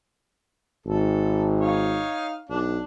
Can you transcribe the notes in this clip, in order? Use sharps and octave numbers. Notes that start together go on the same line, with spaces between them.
G#1 A4
D#4 C#5 F5
B1 D4